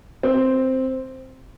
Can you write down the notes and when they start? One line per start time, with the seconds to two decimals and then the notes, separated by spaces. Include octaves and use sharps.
0.23 C4